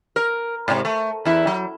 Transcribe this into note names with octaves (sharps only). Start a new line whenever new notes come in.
A#4
G#2 C3
A3
E2 E4
F#3